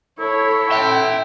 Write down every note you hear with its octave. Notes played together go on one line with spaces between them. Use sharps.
E4 A4 C#5
E5 G5 C6